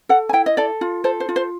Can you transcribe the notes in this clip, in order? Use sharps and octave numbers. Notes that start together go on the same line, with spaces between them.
A4 F#5
G#5
E4 G5
D#5
A4 D5
F4
A4 C5
C5
F4
C5